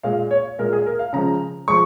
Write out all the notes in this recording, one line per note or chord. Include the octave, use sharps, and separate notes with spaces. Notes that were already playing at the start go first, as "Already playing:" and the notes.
A#2 G#3 F5
C#5
A#2 G#3 A#4
G#4
A#4
F5
C#3 F3 G#3 A#5
F3 G#3 C#6